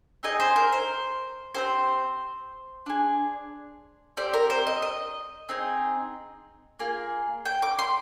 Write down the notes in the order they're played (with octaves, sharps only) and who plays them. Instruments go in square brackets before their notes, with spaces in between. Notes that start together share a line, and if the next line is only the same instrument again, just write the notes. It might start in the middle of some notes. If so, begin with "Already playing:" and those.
[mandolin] C4 D#4 G#4 D#5
C5
A#4
C5
C4 D#4 G4 C5
D4 G#4
C4 G4 D5
A#4
C5
D#5
D#5
C4 D#4 G#4
A#3 F4 G#4
G5
D6
C6